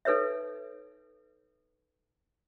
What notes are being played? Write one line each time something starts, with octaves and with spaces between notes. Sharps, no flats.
D#4 A4 B4 C#5 E5